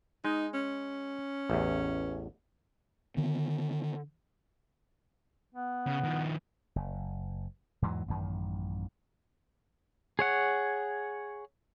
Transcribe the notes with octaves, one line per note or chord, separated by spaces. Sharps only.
G#3 D#4
C#4
A1 E2
D3 D#3 B3
B3
C#3
D#3 F3
F#1
E2 G#2 E3 F#3
A1 F#2 D#3
G#4 C#5 F#5